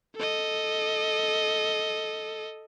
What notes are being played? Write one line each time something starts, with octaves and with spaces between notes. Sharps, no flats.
A4 D#5